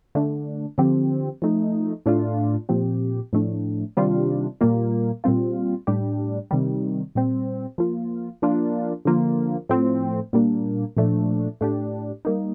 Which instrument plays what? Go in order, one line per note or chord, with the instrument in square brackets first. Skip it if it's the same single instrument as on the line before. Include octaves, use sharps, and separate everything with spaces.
[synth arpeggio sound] D3 A3 D4
D3 F3 C4 G4
F3 A3 D#4
A2 A3 D4 F4
A#2 F3 C4 G4
A2 F3 A3 D4
C3 D#3 G3 D4 F4
A#2 G3 A#3 F4
A#2 G3 C4 F4
A2 G3 D4 G4
C3 D#3 G3
A#2 G3 C4
F3 A#3 F4
F3 A#3 D4 F4
D3 F3 A#3 F4
A2 F3 A3 C4
A#2 G3 A#3 D4
A#2 F3 A3 D4
A2 A3 D4 G4
G3 A#3 D#4